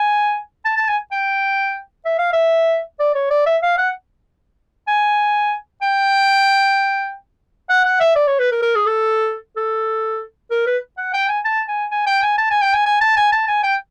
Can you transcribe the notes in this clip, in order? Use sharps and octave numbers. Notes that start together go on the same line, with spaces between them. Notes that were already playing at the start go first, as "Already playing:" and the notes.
Already playing: G#5
A5
A5
G#5
G5
E5
F5
E5
D5
C#5
D5
E5
F5
F#5
G#5
G5
F#5
F#5
E5
D5
C#5
B4
A#4
A#4
G#4
A4
A4
A#4
B4
F#5
G5
G#5
A5
G#5
G#5
G5
G#5
A5
G#5
G5
G#5
G#5
A5
G#5
A5
G#5
G5